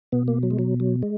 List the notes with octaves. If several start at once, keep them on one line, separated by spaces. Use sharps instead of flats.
B2 B3
A#3
F#3
G#3
F#3
F#3
G#3